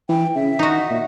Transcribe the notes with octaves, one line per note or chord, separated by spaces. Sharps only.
E3 G5
C#3 E5
D#3 D#4 F#4
A#2